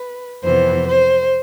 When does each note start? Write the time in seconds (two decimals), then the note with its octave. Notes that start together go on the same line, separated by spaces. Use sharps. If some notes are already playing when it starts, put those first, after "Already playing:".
Already playing: B4
0.44 F2 C3 E3 B3 C5
0.87 C5